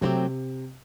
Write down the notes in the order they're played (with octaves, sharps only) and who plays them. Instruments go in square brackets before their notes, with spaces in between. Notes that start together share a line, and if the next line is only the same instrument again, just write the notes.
[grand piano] C3 [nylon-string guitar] F#3 A3 C4 E4 G4